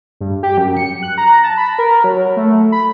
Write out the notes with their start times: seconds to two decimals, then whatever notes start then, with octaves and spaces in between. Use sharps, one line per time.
0.21 G2
0.43 G4
0.58 F#2
0.77 C#7
1.02 F#6
1.18 A#5
1.44 A5
1.57 B5
1.79 A#4
2.04 F#3
2.37 A3
2.72 B5